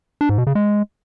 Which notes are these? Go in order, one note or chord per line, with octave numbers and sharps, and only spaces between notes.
D4
G#2
B2
C#3
G#3